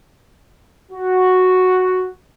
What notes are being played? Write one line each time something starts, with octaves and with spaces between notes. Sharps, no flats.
F#4